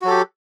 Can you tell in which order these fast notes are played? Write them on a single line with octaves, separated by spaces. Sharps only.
F#4 F#3 A4 G4